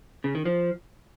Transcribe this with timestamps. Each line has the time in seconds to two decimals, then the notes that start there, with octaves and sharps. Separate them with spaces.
0.24 C#3
0.35 D#3
0.46 F3